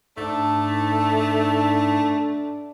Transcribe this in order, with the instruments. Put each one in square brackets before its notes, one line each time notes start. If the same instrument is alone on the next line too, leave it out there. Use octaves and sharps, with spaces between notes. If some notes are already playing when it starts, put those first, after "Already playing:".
[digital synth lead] G#2 [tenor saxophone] A3 [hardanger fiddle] D4